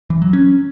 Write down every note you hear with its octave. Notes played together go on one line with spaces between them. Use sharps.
E3
F#3
C#4